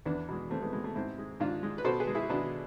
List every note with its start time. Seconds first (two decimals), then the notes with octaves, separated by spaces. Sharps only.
0.06 E2 B3 D4
0.29 B2 G#3
0.50 E2 A3 C4
0.62 G#3 B3
0.73 B2 G#3
0.84 A3
0.95 G#2 C4 E4
1.18 G#3
1.40 G#2 D4 F4
1.63 G#3
1.78 B4
1.84 B2 A4 C5
2.00 G#4 B4
2.07 G#3
2.15 E4 G#4
2.29 B2 B3 D4